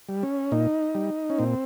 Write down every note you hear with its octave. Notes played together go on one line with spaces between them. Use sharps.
G3
C#4
A#2 D#4
G3
C#4
A#2 C4